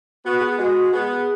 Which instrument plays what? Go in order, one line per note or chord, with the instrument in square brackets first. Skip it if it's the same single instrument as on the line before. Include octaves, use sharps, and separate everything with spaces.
[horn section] B3 [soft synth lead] F#4
[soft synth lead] G#4
[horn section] G#3 [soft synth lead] F#4
[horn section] B3 [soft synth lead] G#4